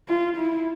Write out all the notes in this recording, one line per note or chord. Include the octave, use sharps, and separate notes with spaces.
F4
E4